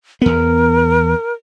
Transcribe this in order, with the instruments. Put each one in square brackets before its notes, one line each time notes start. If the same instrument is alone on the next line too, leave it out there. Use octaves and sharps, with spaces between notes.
[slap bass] E2 B3 [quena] A#4